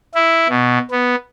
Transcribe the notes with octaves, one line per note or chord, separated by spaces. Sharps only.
E4
B2
B3